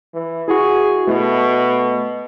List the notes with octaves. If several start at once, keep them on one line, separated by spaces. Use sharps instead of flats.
E3
E4 F#4 G#4
B2 A3